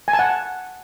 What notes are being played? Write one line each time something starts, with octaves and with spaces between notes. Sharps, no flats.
G#5
A5
F#5